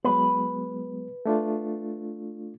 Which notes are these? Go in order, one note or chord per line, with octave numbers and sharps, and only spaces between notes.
F#3 G#3 B3 B4
A3 D4 F4